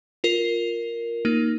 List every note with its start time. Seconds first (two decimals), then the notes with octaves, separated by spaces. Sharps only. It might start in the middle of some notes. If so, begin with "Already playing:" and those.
0.24 F4 A#4
1.25 A#3 D#4